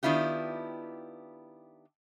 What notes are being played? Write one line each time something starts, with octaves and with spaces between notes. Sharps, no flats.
D#3 B3 D4 E4 F4 G4